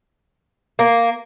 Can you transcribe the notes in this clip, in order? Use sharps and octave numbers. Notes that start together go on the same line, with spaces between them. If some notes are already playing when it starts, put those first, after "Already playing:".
A#3